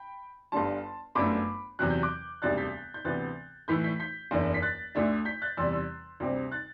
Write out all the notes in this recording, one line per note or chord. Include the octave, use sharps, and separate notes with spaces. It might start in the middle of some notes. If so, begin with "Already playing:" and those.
Already playing: G5 B5
G1 G2 D3 G3 A5 C6
G1 F#2 D3 A3 B5 D6
E2 C3 F#3 F#6
G6
D6 F#6
E1 D2 C3 G3 F#6 A6
G6 B6
G6
D2 C3 E3 B3 F#6 A6
A2 E3 A3 E4 G6 B6
G6 B6
G6 B6
F#1 E2 D3
B6
F#6 A6
D2 D3 A3 D4
G6 B6
F#6 A6
E2 C3 G3 C6 E6
C6 E6
D2 C3 G3 C4
F#6 A6